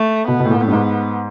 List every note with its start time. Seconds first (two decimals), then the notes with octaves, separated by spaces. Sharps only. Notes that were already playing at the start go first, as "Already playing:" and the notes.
Already playing: A3
0.28 B2 B3
0.40 B2
0.45 A2
0.51 A#2
0.61 A2
0.67 G2
0.72 G#2